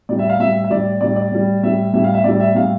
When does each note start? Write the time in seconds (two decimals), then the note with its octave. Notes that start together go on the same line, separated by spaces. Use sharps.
0.09 A2 G3 D5
0.19 E5
0.29 F5
0.40 A2 G3 E5
0.64 E5
0.70 A2 G3 D5
1.01 A2 G3 D5
1.16 D5
1.32 A2 G3
1.63 A2 G3 E5
1.93 A2 G3 E5
2.04 F5
2.14 E5
2.24 A2 G3 D5
2.40 E5
2.55 A2 G3 F5